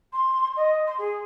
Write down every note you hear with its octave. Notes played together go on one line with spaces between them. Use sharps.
C6
D#5
C6
G#4